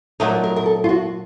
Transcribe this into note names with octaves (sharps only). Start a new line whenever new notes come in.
A#2 F#3 A3 D#4 A#4
A#4
A#4
A4
F4
F#4